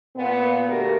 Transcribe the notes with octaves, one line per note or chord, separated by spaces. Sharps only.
A#2 B3
D3 A3 A#3 F#4 G4 A#4